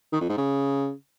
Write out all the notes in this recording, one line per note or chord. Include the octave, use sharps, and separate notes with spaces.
D#3
F2
G#2
C#3